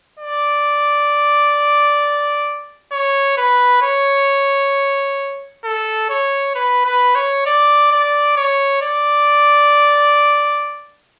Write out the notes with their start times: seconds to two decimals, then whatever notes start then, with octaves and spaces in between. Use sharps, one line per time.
0.20 D5
2.92 C#5
3.37 B4
3.82 C#5
5.64 A4
6.10 C#5
6.55 B4
6.86 B4
7.15 C#5
7.46 D5
7.91 D5
8.37 C#5
8.82 D5